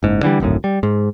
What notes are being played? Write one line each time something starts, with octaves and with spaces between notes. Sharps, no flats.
F#1 G#2
D3 E3 F#3 G3
D1 G#1 F#2 A2
G3
G#2